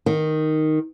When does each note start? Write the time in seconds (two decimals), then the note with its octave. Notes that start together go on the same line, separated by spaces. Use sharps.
0.06 D#3